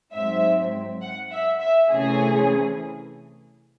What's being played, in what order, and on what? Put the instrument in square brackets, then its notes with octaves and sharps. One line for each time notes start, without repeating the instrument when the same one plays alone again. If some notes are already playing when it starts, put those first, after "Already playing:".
[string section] G#2 F#3 C4 E5
F#5
E5
E5
C3 E3 A3 C#4 G#4